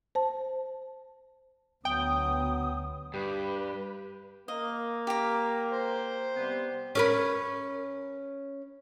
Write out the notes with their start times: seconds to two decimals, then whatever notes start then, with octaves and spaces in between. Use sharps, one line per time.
0.15 C5 A5
1.85 D2 F#3 B3 G5 D#6
3.14 G2 G4 B4
4.48 A#3 D#5
5.07 G4 A#5
5.72 C5
6.36 C3 G3 B3
6.95 C#4 A#4 B4